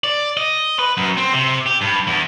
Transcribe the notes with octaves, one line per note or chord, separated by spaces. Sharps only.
D5
D#5
B4
F#2
C4
C3
G4
G2
E2